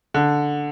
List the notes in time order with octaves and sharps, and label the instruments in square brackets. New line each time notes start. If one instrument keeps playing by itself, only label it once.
[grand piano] D3